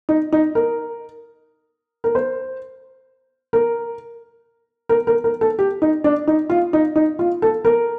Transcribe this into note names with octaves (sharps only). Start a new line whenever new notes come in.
D#4
D#4
A#4
A#4
C5
A#4
A#4
A#4
A#4
A4
G4
D#4
D4
D#4
F4
D#4
D#4
F4
A4
A#4